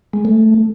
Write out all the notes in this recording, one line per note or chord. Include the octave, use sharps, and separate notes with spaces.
G#3
A3